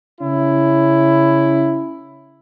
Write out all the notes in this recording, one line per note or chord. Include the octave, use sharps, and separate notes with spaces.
C#3 C#4 E4